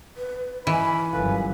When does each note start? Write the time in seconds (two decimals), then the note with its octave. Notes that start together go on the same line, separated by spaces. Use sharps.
0.17 B4
0.67 E3 D#4 G#5 B5
1.13 G1 F#2 F4 A4 B4